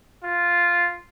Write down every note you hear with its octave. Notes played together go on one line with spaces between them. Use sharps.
F4